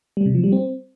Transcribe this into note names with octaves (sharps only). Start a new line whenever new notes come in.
G3
C3
F3
G3
C4